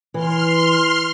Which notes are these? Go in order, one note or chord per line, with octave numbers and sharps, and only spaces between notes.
E3 C6 F6